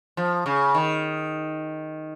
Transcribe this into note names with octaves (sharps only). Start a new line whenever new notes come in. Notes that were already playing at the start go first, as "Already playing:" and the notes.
F3
C#3
D#3